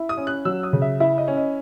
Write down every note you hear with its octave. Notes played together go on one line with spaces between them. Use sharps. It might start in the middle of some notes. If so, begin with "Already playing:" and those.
Already playing: E4
D#6
C#4
F#6
F#3 E6
D#6
C#3
E5
E4 E5
D#5
C#4
D#5